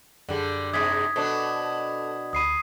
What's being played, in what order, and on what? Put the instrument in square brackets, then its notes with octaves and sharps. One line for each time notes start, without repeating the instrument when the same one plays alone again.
[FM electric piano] F#2 G#4 [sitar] D3 G3
[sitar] G#2 C3 G#3 [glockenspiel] D#6 G#6 B6
[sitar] B2 D4 [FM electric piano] A4 C5 A5
[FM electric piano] D2 B5 [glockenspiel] D#6 C7 D#7